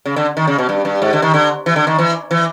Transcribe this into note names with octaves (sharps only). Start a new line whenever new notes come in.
C#3
D3
D#3
C#3
B2
G2
G2
G#2
D3
D#3
D3
E3
D3
D#3
E3
E3